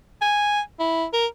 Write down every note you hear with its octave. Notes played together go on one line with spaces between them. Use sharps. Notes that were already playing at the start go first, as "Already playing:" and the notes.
G#5
E4
A#4